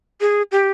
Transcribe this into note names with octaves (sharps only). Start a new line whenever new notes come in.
G#4
G4